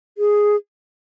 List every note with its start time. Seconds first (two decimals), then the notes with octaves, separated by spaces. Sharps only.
0.18 G#4